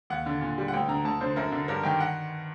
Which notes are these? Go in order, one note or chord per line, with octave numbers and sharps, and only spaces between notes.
D#2 F#5
D3
A#2
G3
F#5
D2 G5
D3 A#5
D2 A5
D3 C5
F#2 A#4
D3
G2 A#4
D#3 G5
F#5